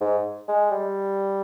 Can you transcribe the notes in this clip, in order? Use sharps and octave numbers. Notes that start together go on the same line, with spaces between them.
G#2
G#3
G3